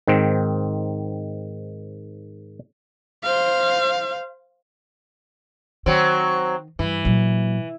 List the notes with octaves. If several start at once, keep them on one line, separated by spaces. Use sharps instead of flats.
G#2 D#3 C4
C5 F5
D#3 F#3 C4
G2 E3
A#2 F#3